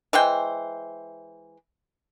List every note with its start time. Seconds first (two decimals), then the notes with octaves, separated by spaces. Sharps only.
0.13 E3 G#3 C5 G5